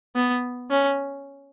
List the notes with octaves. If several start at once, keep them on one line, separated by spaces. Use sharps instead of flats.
B3
C#4